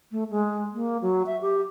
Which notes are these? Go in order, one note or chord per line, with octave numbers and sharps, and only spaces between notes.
A3
G#3
A#3
F#3
E5
G4